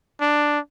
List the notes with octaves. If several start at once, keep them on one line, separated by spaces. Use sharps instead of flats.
D4